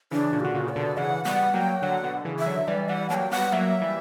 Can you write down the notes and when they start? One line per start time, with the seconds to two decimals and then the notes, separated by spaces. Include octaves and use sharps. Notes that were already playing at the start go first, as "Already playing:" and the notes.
0.11 C#3 E3 D4
0.33 A#2 C#3
0.40 G4
0.44 D3 F#4
0.54 A#2 C#3
0.69 D5
0.76 B2 D3
0.97 C#3 E3 F#5
1.25 G3 B3 F#5
1.54 F#3 A#3 G5
1.82 D3 F#3 F#5
2.03 B2 D3
2.25 C#3 E3
2.39 E5
2.46 D3 F#3
2.67 E3 G3 D5
2.89 E3 G3 F#5
3.10 F#3 A#3 G5 A5
3.31 G3 B3 F#5
3.52 F#3 A#3 E5
3.81 E3 G3